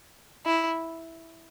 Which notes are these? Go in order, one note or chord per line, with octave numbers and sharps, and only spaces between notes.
E4